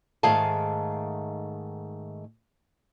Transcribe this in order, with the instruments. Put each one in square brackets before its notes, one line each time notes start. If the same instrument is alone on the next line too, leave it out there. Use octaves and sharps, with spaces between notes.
[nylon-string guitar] G#2 D#3 A3 G#4 F5 A5